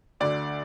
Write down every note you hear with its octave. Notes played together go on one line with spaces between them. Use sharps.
D2 D3 D5